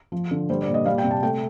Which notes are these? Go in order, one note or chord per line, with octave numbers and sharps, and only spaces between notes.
F3
D3
G3 C5
D5
A#2
D#5
G3 F5
G5
C3
A5
A3 G5